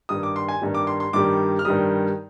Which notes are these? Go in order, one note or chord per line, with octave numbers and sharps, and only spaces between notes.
G2 D#3 G3 D#6
D6
C6
G#5
G2 D#3 G3
D6
C6
C6
G2 D#3 G3 D6
F6
G2 D#3 G3 D#6